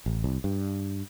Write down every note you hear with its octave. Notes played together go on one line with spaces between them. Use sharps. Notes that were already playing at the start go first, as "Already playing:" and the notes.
A1
C2
G2